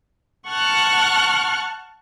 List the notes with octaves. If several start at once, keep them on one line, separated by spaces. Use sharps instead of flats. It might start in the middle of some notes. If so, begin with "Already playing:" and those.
F#5 A5 C#6 F6 F#6